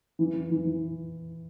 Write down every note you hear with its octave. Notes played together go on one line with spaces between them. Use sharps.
E3
E3
E3
E3